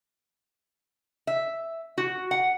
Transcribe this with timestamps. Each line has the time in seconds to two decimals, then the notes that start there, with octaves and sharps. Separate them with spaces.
1.27 E5
1.98 F#4
2.31 F#5